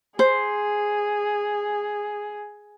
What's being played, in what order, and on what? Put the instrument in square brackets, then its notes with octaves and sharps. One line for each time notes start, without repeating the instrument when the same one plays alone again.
[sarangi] G#4 [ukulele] C5